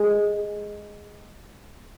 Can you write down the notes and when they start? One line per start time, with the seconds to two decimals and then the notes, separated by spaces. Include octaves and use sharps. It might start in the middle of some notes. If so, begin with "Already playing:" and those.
Already playing: G#3